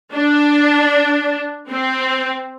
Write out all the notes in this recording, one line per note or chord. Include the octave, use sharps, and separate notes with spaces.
D4
C4